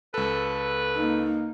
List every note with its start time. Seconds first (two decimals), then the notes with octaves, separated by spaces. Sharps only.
0.14 C#2 A4 B4
0.96 A#3 D#4